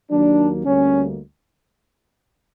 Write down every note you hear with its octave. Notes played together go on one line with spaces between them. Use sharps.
D#2 D#3 F#3 A#3 D4
D2 D3 G3 A#3 C#4